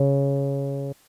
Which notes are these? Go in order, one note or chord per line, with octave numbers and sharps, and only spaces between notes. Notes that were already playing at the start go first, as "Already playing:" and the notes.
Already playing: C#3